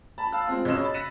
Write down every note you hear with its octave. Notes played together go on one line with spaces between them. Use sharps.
A5 B5
F5 A5 E6 F#6
G#3 C4 F4
B1 C#3 C#5 D#5 E6 E7
B5 A6
F#6 A#6 B6 C#7 D#7 E7